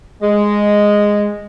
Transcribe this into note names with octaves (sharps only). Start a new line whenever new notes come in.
G#3